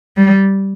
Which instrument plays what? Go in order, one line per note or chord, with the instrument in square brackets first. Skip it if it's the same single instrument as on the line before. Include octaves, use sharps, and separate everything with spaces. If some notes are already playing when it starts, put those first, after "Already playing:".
[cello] G3